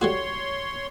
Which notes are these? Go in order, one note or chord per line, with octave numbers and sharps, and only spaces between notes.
G3 A3 F#4 C#5 C6